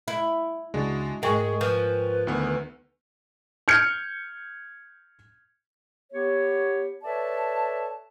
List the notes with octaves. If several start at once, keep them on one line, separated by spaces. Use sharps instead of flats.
E4
C#2 C#3 G#3 D4 F#4 A6
G#2 G#3 G#4 A#4 G5 G#5 C#6
F3 B4
D2 D#3 B3
F6 G6 G#6 C#7
B3 G4 C#5
A4 B4 C#5 D5 E5 A5